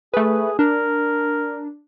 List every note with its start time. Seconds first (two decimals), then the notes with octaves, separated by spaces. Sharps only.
0.14 A3 G#4 B4
0.59 D4 A#4